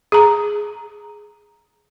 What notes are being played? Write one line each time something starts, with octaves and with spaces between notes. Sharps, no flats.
G#4 A#5